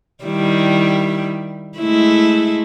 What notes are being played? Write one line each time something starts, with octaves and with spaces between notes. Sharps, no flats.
D#3 G3 E4
G#3 A3 E4